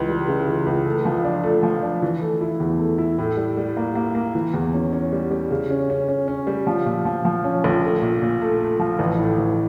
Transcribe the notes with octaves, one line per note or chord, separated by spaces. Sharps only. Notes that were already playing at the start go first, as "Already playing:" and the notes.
Already playing: C#2 E3
G3
C#3
E3
C#2
A3
F3
D4
A3
F3
D4
E3
A3
E4
E2
A3
E4
A2
G3
G3
A#3
A#3
A#3
E3
E2
C#4
C#4
G3
G3
C#3
C#4
C#4
C#4
C#4
G3
F3
A#2
F3
F3
C#4
A#1
A3
A#2
A#2
A3
A3
F3
A1
A2
A1